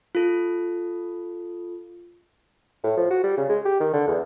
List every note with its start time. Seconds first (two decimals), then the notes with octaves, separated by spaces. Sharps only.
0.15 F4 A4
2.84 A2
2.97 F3
3.10 F#4
3.24 G3
3.38 C#3
3.49 G#3
3.66 G4
3.80 D#3
3.94 D3
4.08 E2